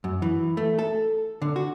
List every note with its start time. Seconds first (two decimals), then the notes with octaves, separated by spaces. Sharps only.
0.04 F#2
0.22 E3
0.57 A3
0.79 A4
1.42 D3
1.56 F#4